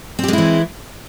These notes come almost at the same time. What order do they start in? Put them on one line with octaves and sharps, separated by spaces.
C4 G4 G#3 E4 E3